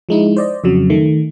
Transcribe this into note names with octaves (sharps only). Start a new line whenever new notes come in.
F3 G#3 D#4 E4
C5 D5 D#5
F2 C#3 F#3
D#3 A3